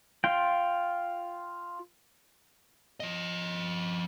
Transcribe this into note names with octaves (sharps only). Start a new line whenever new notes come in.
F4 G5
F3 D#5